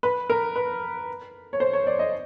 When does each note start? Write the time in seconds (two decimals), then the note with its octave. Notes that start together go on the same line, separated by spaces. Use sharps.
0.03 B4
0.30 A#4
0.56 B4
1.53 C#5
1.60 C5
1.73 C#5
1.87 D5
1.99 D#5